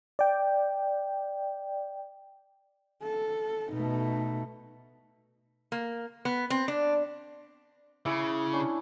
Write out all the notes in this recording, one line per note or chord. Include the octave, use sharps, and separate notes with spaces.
D5 G5
A4
B2 A3 D#4
A#3
B3
C4
D4
C#3 E4 D6
C#4 D4